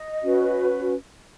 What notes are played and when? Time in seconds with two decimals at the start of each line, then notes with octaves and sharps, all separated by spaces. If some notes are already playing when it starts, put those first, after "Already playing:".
Already playing: D#5
0.22 C#4 F#4 B4